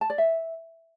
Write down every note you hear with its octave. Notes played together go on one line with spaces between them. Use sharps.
A5
D5
E5